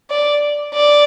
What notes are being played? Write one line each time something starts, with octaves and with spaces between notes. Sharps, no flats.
D5
D5